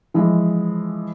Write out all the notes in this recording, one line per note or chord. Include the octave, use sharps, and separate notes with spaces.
E3 F3 G#3